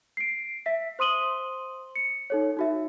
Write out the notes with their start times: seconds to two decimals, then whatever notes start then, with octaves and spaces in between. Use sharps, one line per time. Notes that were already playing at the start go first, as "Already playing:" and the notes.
0.17 C7 D7
0.66 E5 B6
0.99 C5 C6 D#6 D#7 F#7 G7
1.96 C#7
2.30 D#4 A4 C#5
2.57 D#4 F#4 E5